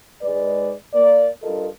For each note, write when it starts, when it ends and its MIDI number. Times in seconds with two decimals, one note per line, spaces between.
0.22 0.73 44
0.22 0.73 56
0.22 0.73 71
0.22 0.73 74
0.94 1.30 58
0.94 1.30 74
1.43 1.67 43
1.43 1.67 65
1.43 1.67 69
1.43 1.67 70
1.43 1.67 75